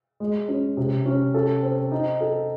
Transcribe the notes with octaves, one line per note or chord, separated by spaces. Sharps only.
G#3
C#4
C3
C#4
A4
C4
D#4
A4